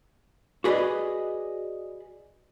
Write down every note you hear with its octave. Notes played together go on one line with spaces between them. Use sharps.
F#4 G#4 B4 D5 D#5